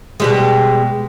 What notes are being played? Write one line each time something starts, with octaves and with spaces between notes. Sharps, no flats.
B2 G3 G#3